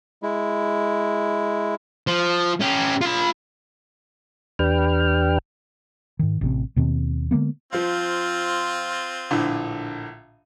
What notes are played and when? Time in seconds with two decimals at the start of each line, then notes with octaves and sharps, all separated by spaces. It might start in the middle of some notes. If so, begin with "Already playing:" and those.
0.23 G#3 E4
2.07 F3
2.61 C#4 G4
3.01 F4 B5
4.59 E2 D4 G4 B4 G5 F6
6.19 G#2 D#3
6.41 A1 C3 C4
6.76 D#2 B2 D#3 C4
7.31 D3 G#3 A#3 B3
7.73 F3 C4 F4 F5
9.31 A#1 A2 D3